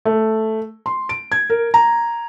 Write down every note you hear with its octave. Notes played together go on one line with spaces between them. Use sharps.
A3
C6
D7
G#6
A#4
A#5